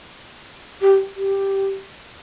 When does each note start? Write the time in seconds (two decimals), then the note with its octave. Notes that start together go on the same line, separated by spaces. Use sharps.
0.81 G4
1.15 G4